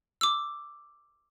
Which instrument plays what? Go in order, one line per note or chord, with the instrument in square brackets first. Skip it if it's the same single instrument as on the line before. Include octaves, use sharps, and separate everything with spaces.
[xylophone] D6 E6